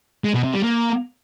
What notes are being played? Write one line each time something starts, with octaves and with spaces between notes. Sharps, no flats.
G#3
B2
C3
G3
A#3